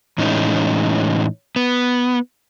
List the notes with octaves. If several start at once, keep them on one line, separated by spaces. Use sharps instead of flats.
A2 E3 G#3 C#4 D#4
B3